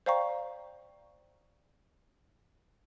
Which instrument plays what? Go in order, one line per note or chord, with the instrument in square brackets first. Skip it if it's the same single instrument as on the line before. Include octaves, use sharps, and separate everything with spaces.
[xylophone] C5 D5 F5 G5 A#5 C#6